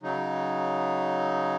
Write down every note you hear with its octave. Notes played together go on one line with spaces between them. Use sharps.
C#3 F#3 D#4